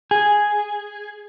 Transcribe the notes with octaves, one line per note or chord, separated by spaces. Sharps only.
G#4